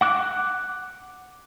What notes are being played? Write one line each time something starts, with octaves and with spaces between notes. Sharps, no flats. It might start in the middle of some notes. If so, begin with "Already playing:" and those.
F#5 D6 F#6